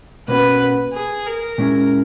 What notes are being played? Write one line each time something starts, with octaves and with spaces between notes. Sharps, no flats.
B2 A#3 C#4 F#4 B4
G#4
A#4
A#2 G#3 C#4 E4 G#4